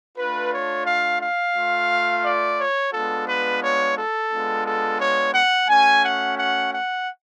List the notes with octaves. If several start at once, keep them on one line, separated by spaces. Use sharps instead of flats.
A3 D4 F4 B4
C#5
F5
F5
A3 F4
D5
C#5
G#3 B3 D4 F4 A4
B4
C#5
A4
G#3 B3 D4 F4
A4
C#5
F#5
A3 C#4 F#4 G#5
F#5
F#5
F#5